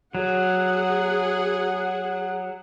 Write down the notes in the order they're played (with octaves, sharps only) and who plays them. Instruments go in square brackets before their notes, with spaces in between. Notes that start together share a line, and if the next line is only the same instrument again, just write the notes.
[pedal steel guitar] F#3 [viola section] G#4 F#5